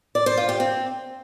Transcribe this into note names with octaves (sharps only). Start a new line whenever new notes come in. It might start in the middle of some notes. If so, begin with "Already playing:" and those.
D5
C5
F4
G4
C4